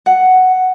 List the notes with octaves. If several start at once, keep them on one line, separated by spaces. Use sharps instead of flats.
F#5